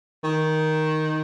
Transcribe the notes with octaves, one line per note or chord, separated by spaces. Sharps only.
D#3